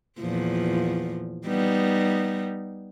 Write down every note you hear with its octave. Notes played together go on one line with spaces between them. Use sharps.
E2 A#2 F3
G3 B3 D#4